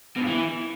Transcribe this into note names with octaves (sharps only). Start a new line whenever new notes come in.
B2
G2
E3